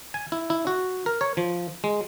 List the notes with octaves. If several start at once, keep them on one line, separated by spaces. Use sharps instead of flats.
G#5
E4
E4
F#4
A#4
C#5
F3
G#3